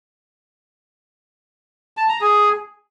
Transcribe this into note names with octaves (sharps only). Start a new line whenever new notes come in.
A5
A#5
G#4